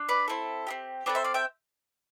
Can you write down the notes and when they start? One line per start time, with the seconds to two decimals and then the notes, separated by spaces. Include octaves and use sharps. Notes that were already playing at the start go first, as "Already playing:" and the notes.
Already playing: D4
0.09 B4 D5
0.28 C4 E4 A4
0.67 C4 E4 G4
1.06 C4 F4 A4 B4 D5
1.15 C5 E5
1.24 D5 F5
1.34 E5 G5